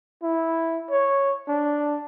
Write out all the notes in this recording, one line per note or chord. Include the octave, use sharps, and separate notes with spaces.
E4
C#5
D4